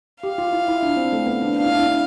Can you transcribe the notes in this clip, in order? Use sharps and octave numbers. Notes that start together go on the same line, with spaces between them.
G4 F5
F4
E4
E4
D4
C4
A3
B3
D4
D4 F5
E4
D4
E4
D4